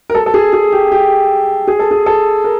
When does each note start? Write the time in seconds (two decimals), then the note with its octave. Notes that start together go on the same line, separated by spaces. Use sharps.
0.10 A#4
0.15 A4
0.26 A4
0.34 G#4
0.53 G#4
0.73 G4
0.92 G4
1.68 G#4
1.79 A4
1.91 G#4
2.06 A4
2.44 A#4